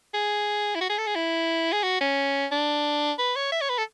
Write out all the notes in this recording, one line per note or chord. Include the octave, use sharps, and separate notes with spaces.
G#4
E4
F#4
G#4
A4
G#4
E4
G#4
F#4
C#4
D4
B4
C#5
E5
C#5
B4
A4